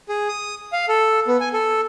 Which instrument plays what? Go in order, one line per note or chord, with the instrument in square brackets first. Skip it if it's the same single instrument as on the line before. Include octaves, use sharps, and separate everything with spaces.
[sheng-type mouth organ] G#4
D#6
F5
A4
B3
G#5
A4